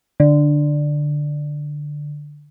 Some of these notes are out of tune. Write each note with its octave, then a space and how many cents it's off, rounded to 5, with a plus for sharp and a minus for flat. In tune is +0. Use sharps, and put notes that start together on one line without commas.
D3 +5